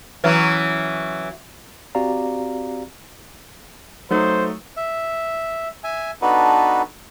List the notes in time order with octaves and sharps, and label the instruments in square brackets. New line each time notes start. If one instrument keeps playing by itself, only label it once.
[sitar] E3 F#3 C#4
[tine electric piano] C4 F#4 G4 D5 F5 A#5
[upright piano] F#3 A3 D#4 [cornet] C5
[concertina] E5
E5 G#5
B3 D4 D#4 F#4 A4 B4